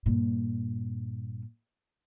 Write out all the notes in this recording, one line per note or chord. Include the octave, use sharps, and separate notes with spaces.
G2 A#2